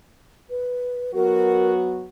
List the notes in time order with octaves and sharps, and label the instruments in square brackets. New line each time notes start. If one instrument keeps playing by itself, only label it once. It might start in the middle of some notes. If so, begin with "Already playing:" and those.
[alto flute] B4
[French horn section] F#3 B3 F#4 [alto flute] A#4